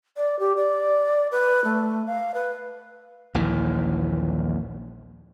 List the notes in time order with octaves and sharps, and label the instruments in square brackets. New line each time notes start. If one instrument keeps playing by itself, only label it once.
[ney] D5
G4
D5
B4
A3
F5
B4
[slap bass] A#1 D#2 A#2 E3